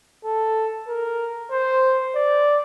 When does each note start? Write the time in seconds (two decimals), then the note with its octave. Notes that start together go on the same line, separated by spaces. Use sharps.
0.25 A4
0.87 A#4
1.51 C5
2.16 D5